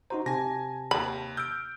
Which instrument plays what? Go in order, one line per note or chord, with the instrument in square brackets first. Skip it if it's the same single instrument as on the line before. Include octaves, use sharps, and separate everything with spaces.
[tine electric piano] D#4 F#4 C5 [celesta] A#5
[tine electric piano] C3 [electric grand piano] G#5 A#6 [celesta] A5
[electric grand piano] D#2 [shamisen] B5
[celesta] E6 F6 [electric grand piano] G6 D7